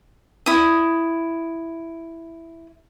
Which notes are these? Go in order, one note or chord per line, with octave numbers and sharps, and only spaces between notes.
E4 D#6